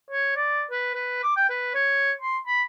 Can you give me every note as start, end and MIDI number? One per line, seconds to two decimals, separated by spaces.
0.11 0.33 73
0.36 0.64 74
0.71 0.93 71
0.94 1.20 71
1.23 1.34 86
1.37 1.49 79
1.50 1.72 71
1.74 2.12 73
2.21 2.38 84
2.47 2.62 83